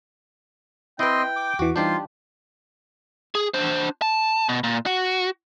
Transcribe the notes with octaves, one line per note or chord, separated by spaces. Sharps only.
C4 E4 B4 D#5 G5 C6
D6
E2 E3 F#4
E3 G3 D4 D#4 F4 G4 C5 G5
G#4
D4 C5
A5
B2
A#2
F#4